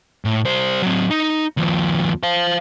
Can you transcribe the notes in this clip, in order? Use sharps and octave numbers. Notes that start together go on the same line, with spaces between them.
A2
G3 C5
F#3 C4
D#4
D#2 F3
C5 F5